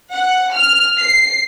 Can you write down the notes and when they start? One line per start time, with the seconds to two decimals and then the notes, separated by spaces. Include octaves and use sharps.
0.13 F#5
0.53 F6
0.99 C7